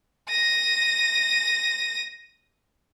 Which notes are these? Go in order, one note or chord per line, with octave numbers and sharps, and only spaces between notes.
A#6 D#7